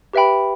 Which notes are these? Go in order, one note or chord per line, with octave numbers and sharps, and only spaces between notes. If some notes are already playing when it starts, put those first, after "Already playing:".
G4 B4 E5 G5 B5